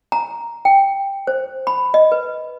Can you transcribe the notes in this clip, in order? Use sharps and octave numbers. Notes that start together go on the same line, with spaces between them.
A#5
G5
C5
B5
D#5
B4